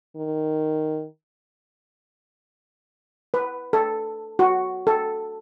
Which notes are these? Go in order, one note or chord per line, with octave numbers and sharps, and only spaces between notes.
D#3
B4
A4
F#4
A4